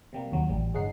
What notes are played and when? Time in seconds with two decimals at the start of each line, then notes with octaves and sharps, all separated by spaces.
0.13 C3 G3 A#3
0.32 D#2 F#3
0.49 A1 G3
0.74 G1 G#3 C#4 D#4 F#5 C7